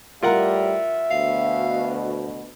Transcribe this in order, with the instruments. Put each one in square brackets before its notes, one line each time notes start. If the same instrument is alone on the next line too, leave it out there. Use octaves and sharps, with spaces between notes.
[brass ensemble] A2 G3 [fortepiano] F4 A#4 F#5 [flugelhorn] E5
[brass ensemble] D2 B2 [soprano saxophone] F5